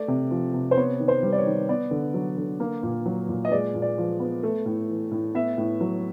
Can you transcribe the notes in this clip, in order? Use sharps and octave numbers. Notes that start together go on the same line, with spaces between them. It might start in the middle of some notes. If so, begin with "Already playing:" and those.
Already playing: A3 D5
C3
F3
C3
C5
B3 C#5
D#3
C5
G3
D5
C#5
D#3
B3 D5
D3
F#3
D3
A#3
A#2
F#3
A#2
D#5
G#3 D5
A#2
D5
F3
B3
A3
A2
E3
A2
B3 E5
A2
F#3